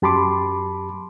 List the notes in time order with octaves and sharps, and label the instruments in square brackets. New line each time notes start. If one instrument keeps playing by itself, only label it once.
[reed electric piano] F#2 G4 A5 B5 C6 D6